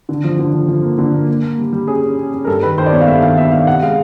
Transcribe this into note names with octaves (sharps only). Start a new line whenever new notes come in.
D3
F3
D3
F3
F3
A#3
D3
A#3
A#3
A#3
G3
G3
C#4 G#4
C#4
C#4
C#4
A#4
G2 A4
D#3 B4
D#3 C5
D5
B3 C#5
F5
G2 E5
D#3 F5
B3 E5
D#3 F5
C3 F#5
G#3 F5